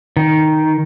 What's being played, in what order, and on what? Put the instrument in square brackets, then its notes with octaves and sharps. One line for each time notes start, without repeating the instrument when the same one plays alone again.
[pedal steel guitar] D#3